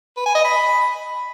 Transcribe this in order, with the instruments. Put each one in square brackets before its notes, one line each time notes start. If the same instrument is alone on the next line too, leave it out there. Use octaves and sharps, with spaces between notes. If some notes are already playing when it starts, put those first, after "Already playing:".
[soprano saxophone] B4
G#5
D#5
B5